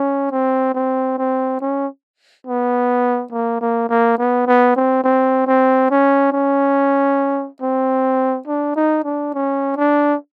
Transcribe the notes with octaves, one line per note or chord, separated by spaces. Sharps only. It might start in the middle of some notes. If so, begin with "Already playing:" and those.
Already playing: C#4
C4
C4
C4
C#4
B3
A#3
A#3
A#3
B3
B3
C4
C4
C4
C#4
C#4
C4
D4
D#4
D4
C#4
D4